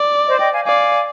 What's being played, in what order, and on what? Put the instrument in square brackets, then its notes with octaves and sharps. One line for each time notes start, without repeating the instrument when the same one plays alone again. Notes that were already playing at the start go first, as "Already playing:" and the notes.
Already playing: [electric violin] D5
[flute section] C5 D#5
D#5 G5
F5 G#5
[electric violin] D5 [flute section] F5 G#5